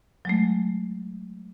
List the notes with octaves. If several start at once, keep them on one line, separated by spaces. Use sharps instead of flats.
F#3 G#3 A3